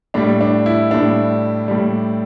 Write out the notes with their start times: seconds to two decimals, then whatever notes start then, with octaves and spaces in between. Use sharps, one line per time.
0.14 A2 G3 D4
0.41 D4
0.66 E4
0.91 A2 G3 D4
1.68 A2 G3